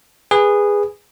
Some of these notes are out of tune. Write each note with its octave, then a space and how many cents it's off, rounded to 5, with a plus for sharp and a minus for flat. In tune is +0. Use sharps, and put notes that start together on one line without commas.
G#4 -15 B4 +0